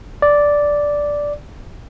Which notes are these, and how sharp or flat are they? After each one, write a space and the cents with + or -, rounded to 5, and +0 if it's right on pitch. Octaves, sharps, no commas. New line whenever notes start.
D5 -5